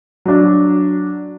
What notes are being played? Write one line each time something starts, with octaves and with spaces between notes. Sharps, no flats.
F#3 D4